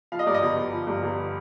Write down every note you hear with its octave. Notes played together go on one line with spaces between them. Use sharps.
F3 F5
D#5
G2 D5
D#5
G1
G1
F3
G2
G1